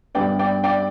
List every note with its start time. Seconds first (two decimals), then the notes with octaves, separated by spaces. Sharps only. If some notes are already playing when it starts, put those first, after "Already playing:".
0.15 G2 G3 B3 D5 G5
0.39 D5 G5
0.64 D5 G5